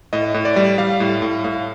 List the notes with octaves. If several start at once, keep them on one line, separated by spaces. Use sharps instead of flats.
A2 D#5
A2
D5
G3
G3 F5
A2
A2
A2 F5